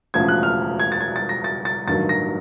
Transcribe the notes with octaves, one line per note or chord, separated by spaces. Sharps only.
E1 D2 C#3 F3 G#6
F#6
F6
G#6
A6
G#6
A6
A#6
A6
A6
A1 G2 D#3 F#3 A6
A#6